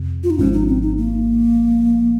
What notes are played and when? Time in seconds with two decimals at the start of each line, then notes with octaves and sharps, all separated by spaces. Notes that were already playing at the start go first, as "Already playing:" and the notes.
Already playing: F2 C3
0.24 F4
0.30 D#4
0.38 G#1 G#2 F3 C#4
0.53 D#4
0.68 C4
0.83 D#4
0.97 A#3